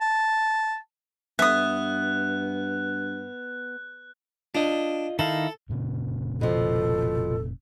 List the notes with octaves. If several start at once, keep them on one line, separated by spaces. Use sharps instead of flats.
A5
G2 B3 E5 D#6 F#6
D4 F4 D#5
D#3 D#4 E4 A4 F5
F1 A#2 C#3
B2 F3 A4